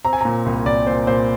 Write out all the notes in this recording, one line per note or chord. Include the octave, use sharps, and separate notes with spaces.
C4 A#5
G#5
A#5
A#2
C2
C2 D5
A#2 C5
A#2 C5